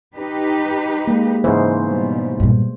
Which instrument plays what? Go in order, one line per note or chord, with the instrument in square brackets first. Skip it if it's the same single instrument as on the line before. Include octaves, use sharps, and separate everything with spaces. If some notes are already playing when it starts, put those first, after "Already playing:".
[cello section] D#4 G4 B4
[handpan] G#3 A#3
[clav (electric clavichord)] G#2 C#3 E3 [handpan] C5
[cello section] B2 G3
[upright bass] G2 A#2